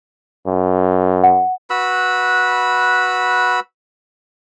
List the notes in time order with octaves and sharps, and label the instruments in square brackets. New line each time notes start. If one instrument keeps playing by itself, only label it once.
[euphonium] F#2
[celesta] F#5
[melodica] F#4 B4 B5 E6